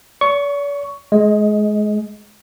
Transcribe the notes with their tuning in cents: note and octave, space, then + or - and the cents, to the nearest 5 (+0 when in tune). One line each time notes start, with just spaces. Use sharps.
D5 -45 C#6 +10
G#3 +25 D#5 +0